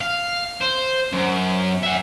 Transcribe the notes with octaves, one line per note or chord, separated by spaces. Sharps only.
F5
C5
F#2
E5 F#5